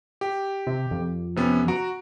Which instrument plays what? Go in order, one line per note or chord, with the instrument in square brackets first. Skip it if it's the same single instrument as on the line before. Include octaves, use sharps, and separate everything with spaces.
[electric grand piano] G4
[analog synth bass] C3
F2
[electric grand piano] C3 B3 C#4
F#4 A#5 D7